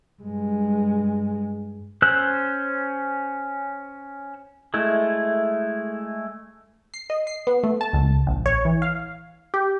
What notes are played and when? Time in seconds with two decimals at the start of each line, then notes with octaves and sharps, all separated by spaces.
0.22 G2 G#3
2.02 C#4 C5 E6 F#6
4.74 G#3 A3 E4
6.94 C7
7.10 D#5
7.27 C7
7.47 B3
7.63 A3
7.81 A5
7.93 C#2
8.27 A#1
8.46 C#5
8.65 E3
8.82 F5
9.54 G4